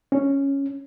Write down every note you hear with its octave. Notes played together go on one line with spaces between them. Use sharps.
C#4